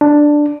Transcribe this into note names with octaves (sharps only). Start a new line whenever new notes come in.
D4